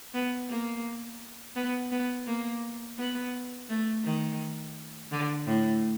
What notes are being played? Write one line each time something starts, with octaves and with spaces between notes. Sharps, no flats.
B3
A#3
B3
B3
A#3
B3
A3
D#3
D3
A2